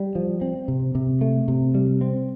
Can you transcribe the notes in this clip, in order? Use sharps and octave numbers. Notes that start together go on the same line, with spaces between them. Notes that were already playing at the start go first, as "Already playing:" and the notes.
Already playing: G3
F3
C4
C3
C3
A3
C3
G3
C4